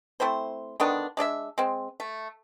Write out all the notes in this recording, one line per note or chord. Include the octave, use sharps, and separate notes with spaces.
A3 C4 E4 C5
D3 D#3 B3 D4
G#3 D4 D5 E5
G#3 C4
A3